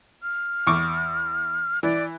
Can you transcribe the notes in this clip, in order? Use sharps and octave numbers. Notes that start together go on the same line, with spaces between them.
F6
E2 C#6 D6
E3 D5